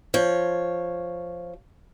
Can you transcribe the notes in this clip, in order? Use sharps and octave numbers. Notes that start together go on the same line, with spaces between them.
F3 C#5